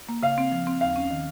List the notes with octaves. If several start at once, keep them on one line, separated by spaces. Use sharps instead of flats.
A#3
C#3 F5
C4
F3
C4
D#2 F5
C#4
D#3